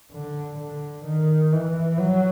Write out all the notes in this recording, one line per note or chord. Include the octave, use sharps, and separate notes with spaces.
D3
D3
D#3
E3
F#3